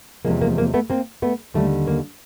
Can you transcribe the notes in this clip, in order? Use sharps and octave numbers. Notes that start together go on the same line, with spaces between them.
E2 C3 F3 G#3 A#3
A#3
A#3
A3 B3
A#3 C4
A3 B3
D#2 D3 G3 A3
A#3